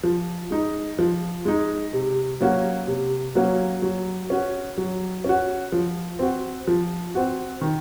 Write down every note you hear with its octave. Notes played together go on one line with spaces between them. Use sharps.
F3
G#3 D#4
F3
G#3 D#4
C3
F#3 A#3 C#4 F#4
C3
F#3 A#3 C#4 F#4
F#3
C#4 F#4
F#3
C#4 F#4
F3
C4 F#4
F3
C4 F#4
D#3